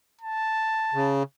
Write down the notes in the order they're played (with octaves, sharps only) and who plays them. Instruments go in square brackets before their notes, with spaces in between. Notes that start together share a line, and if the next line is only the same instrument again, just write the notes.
[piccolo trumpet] A5
[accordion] C#3